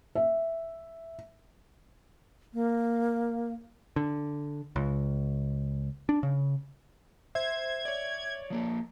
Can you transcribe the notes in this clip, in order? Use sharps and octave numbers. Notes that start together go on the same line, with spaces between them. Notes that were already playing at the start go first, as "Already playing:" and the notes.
E5
A#3
D3
C#2
D4
C#3
C5 E5 G#6
C#5 D5
F3 A#3 A4